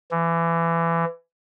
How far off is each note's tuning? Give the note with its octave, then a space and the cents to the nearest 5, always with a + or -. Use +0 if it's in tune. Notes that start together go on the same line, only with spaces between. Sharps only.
E3 +25